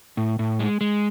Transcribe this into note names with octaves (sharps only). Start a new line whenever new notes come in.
A2
A2
G#3
G#3